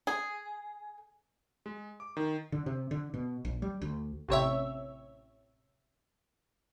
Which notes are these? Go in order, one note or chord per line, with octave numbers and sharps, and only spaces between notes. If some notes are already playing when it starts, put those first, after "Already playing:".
G#4
G#3
D6
D#3
D3
C3
D3
B2
A#1
G3
D2
A1 C3 C#5 E5